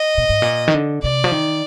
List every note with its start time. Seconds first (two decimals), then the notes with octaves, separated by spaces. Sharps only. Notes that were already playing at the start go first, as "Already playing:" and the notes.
Already playing: D#5
0.18 A#2
0.29 G#2
0.42 A#2
0.68 D#3
0.74 D3
1.03 C3 D5
1.24 F3
1.32 D#3